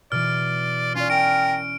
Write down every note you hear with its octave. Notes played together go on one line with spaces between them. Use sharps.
B2 E3 D5 F6
C#4 F4 D5
A#4 G5 D7